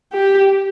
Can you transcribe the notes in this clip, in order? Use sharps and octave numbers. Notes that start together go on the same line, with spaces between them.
G4